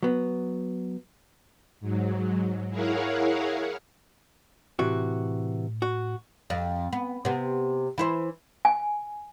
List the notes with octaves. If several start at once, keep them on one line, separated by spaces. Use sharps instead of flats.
F#3 B3
G#2 F#3
E4 G#4 A#4 C#5 F5 F#5
A2 C3 E3 F#4
F#4
F2
B3
C3 B3
E3 E4 C5
G#5